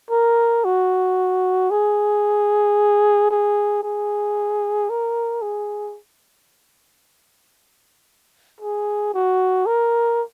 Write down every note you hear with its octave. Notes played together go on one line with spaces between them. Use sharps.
A#4
F#4
G#4
G#4
G#4
A#4
G#4
G#4
F#4
A#4